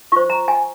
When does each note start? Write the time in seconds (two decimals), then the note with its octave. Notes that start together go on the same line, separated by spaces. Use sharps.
0.12 F4 C5 C#6
0.30 A#5
0.48 G#5